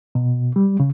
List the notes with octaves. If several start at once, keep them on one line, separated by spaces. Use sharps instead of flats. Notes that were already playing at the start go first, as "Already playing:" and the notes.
B2
G3
C#3